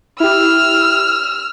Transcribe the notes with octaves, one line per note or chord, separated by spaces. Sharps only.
E4 G4 E6 F6